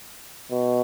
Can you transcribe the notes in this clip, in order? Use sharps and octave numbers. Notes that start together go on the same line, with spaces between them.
B2